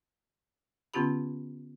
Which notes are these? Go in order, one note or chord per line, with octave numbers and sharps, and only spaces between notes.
D3 B3 C#4 F4 G4 B5